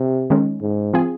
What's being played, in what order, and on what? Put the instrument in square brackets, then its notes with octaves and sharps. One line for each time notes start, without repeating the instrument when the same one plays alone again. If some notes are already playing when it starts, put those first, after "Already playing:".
Already playing: [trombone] C3
[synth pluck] D#3 G#3 C#4
[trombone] G#2
[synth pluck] F3 C4 F4 G#4